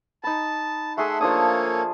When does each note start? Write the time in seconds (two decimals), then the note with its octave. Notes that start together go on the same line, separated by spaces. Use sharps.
0.24 D#4 A5 B5
0.98 A3 G#4 E5 F#5 C6
1.21 F3 A#3 D4 A4 C#5 D#6